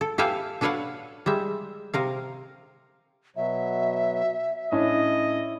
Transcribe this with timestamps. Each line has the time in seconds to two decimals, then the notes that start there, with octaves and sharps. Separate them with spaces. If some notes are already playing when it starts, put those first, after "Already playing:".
0.01 A4
0.18 G4 A4 B4 E5 F5 G#5
0.61 D4 A4 B4 C#5 F5 F#5
1.26 G3 G#3 E5
1.94 C3 A#4 F5
3.36 B2 F#3 E5
4.72 A2 C#4 D4 E4 D#5